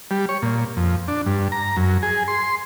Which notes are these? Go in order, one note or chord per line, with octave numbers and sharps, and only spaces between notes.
G3
C#5
A#2
F2
D4
G2
A#5
F#2
G#4
C6